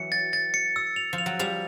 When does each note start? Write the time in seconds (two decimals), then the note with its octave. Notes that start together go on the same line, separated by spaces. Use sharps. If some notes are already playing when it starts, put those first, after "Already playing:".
Already playing: E3 F#3 C#7
0.12 A6
0.33 A6
0.54 C#7
0.76 E6
0.96 F7
1.13 F3
1.18 F7
1.26 F#3
1.39 F3 G3 F7